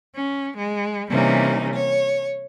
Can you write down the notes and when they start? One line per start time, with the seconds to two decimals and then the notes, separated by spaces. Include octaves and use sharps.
0.14 C#4
0.57 G#3
1.09 C3 E3 G3 A#3 C#4 D#4
1.74 C#5